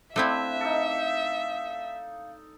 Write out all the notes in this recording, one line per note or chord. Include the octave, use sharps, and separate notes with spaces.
A3 C4 D4 E4 E5 F5
D#4 A4